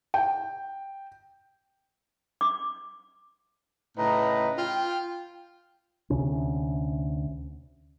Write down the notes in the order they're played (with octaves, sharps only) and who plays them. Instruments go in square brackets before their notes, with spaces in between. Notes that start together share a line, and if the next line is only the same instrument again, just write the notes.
[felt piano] G5
[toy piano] D6
[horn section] A2 C#3 D#4 B4 A#5
F4 G5
[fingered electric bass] D2 C3 C#4